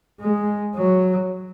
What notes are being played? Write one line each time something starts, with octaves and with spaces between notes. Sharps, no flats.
G#3
F#3